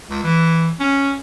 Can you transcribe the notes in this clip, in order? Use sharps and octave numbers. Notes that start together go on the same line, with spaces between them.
C#2
E3
C#4